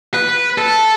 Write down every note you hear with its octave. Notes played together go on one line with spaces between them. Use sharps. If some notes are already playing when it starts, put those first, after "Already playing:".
B4
A4